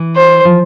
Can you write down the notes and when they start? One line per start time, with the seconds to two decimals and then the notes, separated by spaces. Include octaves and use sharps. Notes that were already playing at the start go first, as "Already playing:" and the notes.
Already playing: E3
0.16 C5
0.45 F3